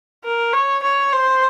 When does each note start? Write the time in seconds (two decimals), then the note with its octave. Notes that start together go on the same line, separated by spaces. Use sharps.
0.24 A#4
0.53 C#5
0.83 C#5
1.13 C5